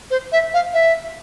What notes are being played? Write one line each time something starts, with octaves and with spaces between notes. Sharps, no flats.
C5
E5
F5
E5